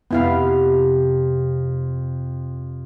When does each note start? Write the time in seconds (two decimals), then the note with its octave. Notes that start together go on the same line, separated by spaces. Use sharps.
0.11 F2 C3 B3 E4 F5